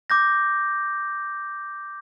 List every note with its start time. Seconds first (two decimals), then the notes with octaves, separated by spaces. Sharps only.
0.10 D6 G6 A#6